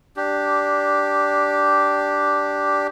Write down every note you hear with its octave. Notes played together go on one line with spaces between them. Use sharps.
D4 G4